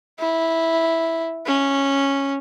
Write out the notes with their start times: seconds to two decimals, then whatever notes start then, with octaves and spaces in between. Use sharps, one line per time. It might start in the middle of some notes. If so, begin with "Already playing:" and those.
0.19 E4
1.46 C#4